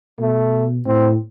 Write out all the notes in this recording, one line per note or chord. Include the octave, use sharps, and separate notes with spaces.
B2 A3
A2 C4